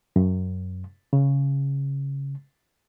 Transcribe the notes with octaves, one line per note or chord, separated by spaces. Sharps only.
F#2
C#3